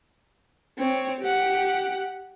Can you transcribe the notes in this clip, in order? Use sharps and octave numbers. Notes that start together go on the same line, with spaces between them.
C4 C#5
G4 F#5